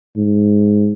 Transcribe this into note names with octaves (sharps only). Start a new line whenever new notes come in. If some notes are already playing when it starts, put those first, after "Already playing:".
G#2